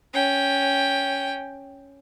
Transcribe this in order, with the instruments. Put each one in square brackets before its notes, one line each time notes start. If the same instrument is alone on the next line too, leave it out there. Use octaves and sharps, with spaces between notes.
[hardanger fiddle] C#4 G5